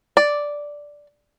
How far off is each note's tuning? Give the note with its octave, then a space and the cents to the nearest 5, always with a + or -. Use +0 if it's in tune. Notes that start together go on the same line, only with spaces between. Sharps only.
D5 -5